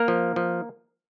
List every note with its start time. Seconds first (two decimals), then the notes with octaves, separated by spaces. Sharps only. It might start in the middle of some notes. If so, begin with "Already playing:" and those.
Already playing: A#3 A#4
0.08 F3
0.36 F3